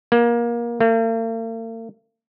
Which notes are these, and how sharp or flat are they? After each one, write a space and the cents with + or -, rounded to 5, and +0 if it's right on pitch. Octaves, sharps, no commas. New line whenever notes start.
A#3 +25
A#3 -45